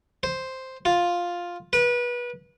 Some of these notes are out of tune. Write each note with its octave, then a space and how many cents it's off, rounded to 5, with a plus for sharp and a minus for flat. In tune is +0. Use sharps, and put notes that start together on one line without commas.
C5 +0
F4 +5
B4 -30